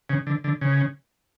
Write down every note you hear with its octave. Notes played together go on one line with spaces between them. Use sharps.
C#3
D3
D3
C#3